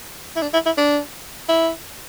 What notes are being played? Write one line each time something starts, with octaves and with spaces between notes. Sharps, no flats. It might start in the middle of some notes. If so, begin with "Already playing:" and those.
E4
D4
E4
E4
D4
E4